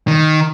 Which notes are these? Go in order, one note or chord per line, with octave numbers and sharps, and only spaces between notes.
D#3